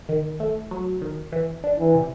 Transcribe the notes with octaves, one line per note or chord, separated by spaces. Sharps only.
D#3
A3
F#3
D#3
E3
D4
E3
C3